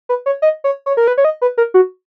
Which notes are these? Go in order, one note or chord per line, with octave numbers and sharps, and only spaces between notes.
B4
C#5
D#5
C#5
C#5
A#4
B4
C#5
D#5
B4
A#4
F#4